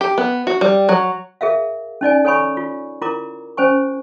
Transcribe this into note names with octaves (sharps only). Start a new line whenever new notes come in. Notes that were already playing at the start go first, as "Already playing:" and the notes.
G4
B3
F#4
G3
F#3
G#4 A#4 E5 F5
C#4 D#4 D5 G#5
A4 C#5 G#5 B5 C#6
F4
E4 F4 A#4 A#5 D6
C#4 C5 G#5 C#6